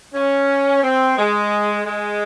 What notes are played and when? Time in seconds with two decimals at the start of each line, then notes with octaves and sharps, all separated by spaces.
0.14 C#4
0.83 C4
1.17 G#3
1.86 G#3